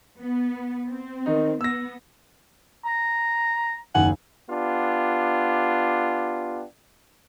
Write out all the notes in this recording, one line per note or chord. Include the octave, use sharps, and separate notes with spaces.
B3
C4
D#3 D#4
B3 E6 A#6
A#5
F#1 D#2 F#5 G#5
B3 D4 F4 G4